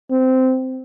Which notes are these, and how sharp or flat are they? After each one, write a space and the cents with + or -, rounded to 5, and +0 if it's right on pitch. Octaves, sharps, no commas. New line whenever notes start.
C4 -15